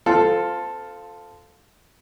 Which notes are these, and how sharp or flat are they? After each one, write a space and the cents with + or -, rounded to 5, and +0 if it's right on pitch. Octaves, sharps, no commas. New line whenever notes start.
C4 -20 F4 +0 A4 +0